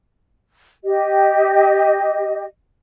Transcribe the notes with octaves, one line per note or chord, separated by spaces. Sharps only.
G4 D#5